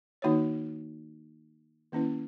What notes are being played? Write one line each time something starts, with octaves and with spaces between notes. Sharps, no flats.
D#3 A#3 D#4 F#4 C#5
D#3 A#3 C#4 E4 B4